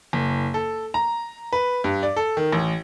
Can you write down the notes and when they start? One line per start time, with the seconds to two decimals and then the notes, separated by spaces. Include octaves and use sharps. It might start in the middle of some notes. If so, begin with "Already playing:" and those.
0.13 F#1
0.54 A4
0.94 A#5
1.53 B4
1.84 G2
2.03 D5
2.16 A4
2.37 D#3
2.52 A1